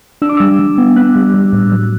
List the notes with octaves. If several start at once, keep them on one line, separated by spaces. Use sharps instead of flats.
D4 E6
D6
G3 E6
G3
B3
B3 F#6
G3
G3
A2
F#3